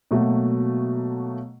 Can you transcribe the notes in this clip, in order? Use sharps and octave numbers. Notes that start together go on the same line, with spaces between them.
B2 F#3 A3 A#3 F#4